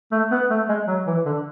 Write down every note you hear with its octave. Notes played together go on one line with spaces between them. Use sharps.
A3
B3
A3
G#3
F#3
E3
D3